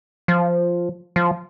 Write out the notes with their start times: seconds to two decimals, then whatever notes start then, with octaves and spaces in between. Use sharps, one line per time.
0.28 F3
1.16 F3